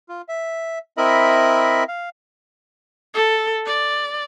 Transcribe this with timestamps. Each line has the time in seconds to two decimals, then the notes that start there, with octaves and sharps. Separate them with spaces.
0.09 F4
0.28 E5
0.97 C4 E4 A#4 D#5 E5 B5
1.88 F5
3.14 A4
3.66 D5